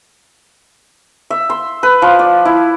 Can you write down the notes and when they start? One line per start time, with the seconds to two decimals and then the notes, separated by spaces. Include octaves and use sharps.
1.30 E5
1.50 C6
1.83 B4
2.02 F3
2.19 D5
2.45 E4